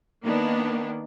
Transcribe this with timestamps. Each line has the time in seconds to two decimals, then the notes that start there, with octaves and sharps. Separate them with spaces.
0.22 D#3 A#3 B3 D4